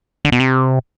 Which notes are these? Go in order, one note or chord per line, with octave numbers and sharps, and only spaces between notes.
D3
B2
C3